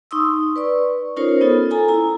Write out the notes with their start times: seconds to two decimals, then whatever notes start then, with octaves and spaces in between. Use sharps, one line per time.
0.11 D#4 C6 C#6 D#6 E6
0.56 B4 D5 C#6
1.17 C#4 D#4 F4 A#4 C5 C#5
1.41 B3 D#4 F4 A4
1.71 A4 G#5 A#5
1.88 E4 A#5